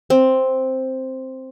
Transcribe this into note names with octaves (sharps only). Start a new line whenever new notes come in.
C4